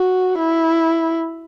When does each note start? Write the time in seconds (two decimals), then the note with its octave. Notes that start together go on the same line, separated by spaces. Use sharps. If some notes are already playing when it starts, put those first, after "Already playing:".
Already playing: F#4
0.39 E4